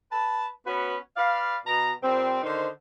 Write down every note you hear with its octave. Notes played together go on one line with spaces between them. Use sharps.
B4 A5
B3 C#4 F#4 B4
B4 D5 F5
B2 A#5
A#2 G3 C4
D3 D#3 D#4 C5